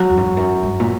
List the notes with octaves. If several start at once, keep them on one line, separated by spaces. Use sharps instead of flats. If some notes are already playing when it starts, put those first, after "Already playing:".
Already playing: F#3
E2
F#2
E2
F#2
G2
A#2